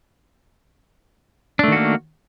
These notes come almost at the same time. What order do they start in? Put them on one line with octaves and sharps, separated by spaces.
D4 A3 D#3 F#4 A#3